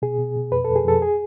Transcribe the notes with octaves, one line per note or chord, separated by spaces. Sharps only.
B2 G#4
B2
B2
F2 B4
F2 A4
G#4
F2 A4
G#4